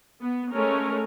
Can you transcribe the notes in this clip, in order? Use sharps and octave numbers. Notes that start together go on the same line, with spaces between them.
B3
G#3 A3 C#4 A#4